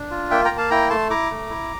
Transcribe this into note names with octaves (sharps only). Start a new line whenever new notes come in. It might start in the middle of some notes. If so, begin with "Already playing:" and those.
Already playing: D4
F4
A#3 E5 G5
G5 A#5
A#3
F5 A5
E4 G5 A#5
A3 A5 C6
E4 A#5 D6
A3
E4